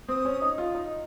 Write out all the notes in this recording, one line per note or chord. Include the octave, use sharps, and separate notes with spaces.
C4 D#6
C#4
D#4
F4
D#4